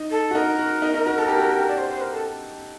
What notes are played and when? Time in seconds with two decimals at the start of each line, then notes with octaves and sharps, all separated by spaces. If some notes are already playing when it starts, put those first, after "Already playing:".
Already playing: D#4
0.11 A4
0.31 F#4
0.35 D#4 A#4
0.58 F#4
0.82 D#4
0.94 D#4
1.06 F#4
1.18 A4
1.28 G4
1.38 F#4
1.48 G4
1.68 D5
1.78 C5
1.90 C5
2.01 A#4
2.13 A4